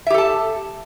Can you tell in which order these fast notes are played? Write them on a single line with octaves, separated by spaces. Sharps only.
E5 G4 A4 A5